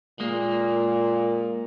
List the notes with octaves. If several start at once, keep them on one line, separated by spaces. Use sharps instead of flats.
A#2 G#3 A#3